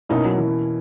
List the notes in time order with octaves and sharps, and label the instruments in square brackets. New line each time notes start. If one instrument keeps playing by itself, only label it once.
[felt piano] B2 A#3 C#4 E4 [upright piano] D#4
[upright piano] F#3
E3